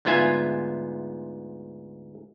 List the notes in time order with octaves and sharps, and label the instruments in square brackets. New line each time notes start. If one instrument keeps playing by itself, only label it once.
[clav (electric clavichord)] D2 G#2 B3 F4 E5 G#5